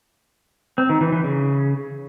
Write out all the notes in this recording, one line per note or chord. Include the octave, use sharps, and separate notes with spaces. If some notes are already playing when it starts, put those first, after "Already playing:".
C4
D#3
E3
E3
C#3